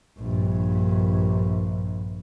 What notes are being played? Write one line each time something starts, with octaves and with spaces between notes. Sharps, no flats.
A#1 G2